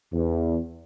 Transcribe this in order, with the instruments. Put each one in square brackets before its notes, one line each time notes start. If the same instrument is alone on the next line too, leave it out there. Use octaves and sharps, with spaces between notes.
[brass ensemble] E2